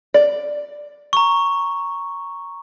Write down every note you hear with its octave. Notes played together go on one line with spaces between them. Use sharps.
D5
A#5 C#6